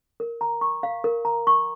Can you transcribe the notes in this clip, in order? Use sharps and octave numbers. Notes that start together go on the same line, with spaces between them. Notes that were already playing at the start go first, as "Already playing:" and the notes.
A#4
A#5
C#6
F5
A#4
A#5
C#6